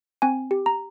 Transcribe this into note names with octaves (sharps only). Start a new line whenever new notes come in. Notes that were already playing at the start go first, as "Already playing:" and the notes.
C4 G#5
G4
A#5